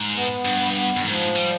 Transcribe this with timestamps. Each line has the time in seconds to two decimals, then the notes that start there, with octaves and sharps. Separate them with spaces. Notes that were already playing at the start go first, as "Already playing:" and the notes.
Already playing: G#2
0.14 B3
0.45 G2
0.75 B3
0.97 G2 D#3
1.05 G#2 F3
1.36 G3